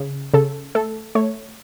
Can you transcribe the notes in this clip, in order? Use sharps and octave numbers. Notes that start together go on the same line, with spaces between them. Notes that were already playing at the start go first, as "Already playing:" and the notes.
Already playing: C#3
C#3 A4
A3 A4
A3 C#5